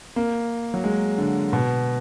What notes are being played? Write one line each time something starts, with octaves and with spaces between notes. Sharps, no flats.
A#3
F#3
G#3
D3
B2